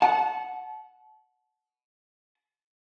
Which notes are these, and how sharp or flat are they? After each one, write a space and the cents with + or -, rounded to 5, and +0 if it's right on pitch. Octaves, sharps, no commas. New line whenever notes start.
F#5 -5 A5 -30